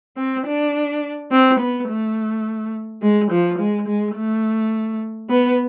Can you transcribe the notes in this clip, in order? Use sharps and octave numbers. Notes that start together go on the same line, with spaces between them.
C4
D4
C4
B3
A3
G#3
F3
G#3
G#3
A3
B3